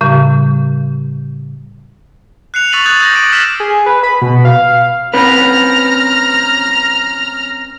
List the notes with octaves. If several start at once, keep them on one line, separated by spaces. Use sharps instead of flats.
A2 C#3 G3
F#6 C7 C#7 F7
C#6 E6 A6 B6 D#7 F#7
D#6 F#6 G#6 A6
E6 G6 G#6 A#6 F#7
D6 A6 D7 D#7
E6 F6 B6 E7
G#4
B4
B5
B2
F5
C4 C#4 B4 A#5 F6